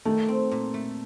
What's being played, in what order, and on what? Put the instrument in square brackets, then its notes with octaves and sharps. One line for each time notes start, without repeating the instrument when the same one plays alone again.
[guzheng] D#3 [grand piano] A3
[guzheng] C4
A#2
A3